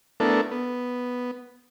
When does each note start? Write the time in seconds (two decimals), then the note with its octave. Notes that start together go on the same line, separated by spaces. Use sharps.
0.20 A3 B3 D4 E4 A4 A#4
0.51 B3